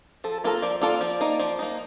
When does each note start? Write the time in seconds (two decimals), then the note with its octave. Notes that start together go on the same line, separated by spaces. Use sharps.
0.24 F3 A4
0.44 A#3 F4 A4 A#4
0.62 F3 D5
0.81 A#3 F4 A4 D5
1.01 F3 D5
1.21 A#3 D#4
1.40 F3
1.59 A#3 D#4